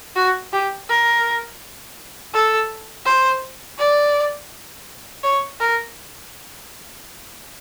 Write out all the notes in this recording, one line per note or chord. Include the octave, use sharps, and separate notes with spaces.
F#4
G4
A#4
A4
C5
D5
C#5
A#4